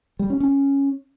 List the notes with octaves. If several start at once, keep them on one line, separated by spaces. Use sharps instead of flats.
G3
C#4
C#4